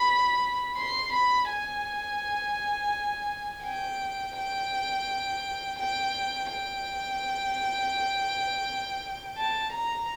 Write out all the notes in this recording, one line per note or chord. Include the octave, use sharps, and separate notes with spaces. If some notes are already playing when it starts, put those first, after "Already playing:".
Already playing: B5
C6
B5
G#5
G5
G5
G5
G5
A5
A#5